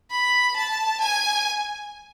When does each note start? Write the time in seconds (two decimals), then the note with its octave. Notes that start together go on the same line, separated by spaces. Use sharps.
0.11 B5
0.56 A5
1.01 G#5